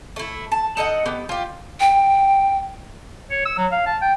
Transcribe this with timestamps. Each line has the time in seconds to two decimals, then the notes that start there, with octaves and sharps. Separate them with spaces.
0.16 A3 E4
0.52 A5
0.77 D#4 A4 D#5 F#5
1.06 B3 G4
1.29 F4 G4
1.80 G5
3.30 C#5
3.46 E6
3.58 F#3
3.72 F5
3.87 A5
4.02 G5